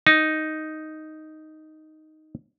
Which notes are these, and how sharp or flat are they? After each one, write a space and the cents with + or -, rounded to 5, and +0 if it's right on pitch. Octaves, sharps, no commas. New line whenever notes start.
D#4 +0